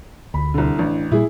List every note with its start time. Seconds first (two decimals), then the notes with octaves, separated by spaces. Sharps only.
0.34 D2 B5
0.54 C2 D3
0.79 A1 D4
1.12 A#2 G3 E4 G#4